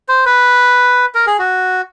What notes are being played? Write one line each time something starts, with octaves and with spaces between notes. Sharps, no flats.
C5
B4
A#4
G#4
F#4